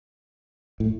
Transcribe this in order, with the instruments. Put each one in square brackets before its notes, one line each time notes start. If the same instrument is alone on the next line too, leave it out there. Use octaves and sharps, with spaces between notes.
[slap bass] A2